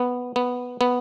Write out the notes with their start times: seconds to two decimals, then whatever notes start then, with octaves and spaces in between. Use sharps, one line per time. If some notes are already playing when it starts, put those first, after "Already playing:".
Already playing: B3
0.36 B3
0.81 B3